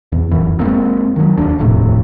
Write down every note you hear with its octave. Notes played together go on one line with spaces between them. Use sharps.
E2
D1 F#2 E3
F#1 G#3 A#3 C4
D#3 F#3
F1 D#2 D4
D#1 F2 A2 C3